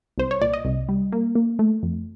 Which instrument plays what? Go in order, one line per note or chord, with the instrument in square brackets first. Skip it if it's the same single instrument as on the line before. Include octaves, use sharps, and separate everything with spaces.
[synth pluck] C2 C5
C#5
A#2 D5
D#5
C2
G3
A#3
A#3
A3
F2